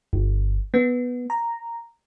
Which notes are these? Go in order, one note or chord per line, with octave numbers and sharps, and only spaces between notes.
G1
B3
A#5